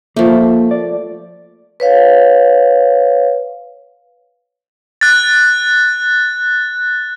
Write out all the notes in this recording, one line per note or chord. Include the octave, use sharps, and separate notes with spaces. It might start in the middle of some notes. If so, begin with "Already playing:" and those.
F3 A3 A#3
D5
B4 C#5 F5
F#6 A6